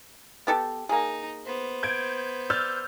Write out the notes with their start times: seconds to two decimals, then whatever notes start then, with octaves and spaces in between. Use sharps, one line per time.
0.47 B3 G4 A4
0.89 A#3 D#4 G#4
1.46 B3 C5
1.83 G6 G#6 D7
2.50 D5 E6 F6 G6